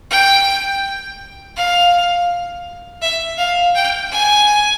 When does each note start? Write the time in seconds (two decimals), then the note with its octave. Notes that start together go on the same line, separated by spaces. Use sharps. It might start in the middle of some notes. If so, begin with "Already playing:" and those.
0.10 G5
1.56 F5
3.02 E5
3.38 F5
3.75 G5
4.11 G#5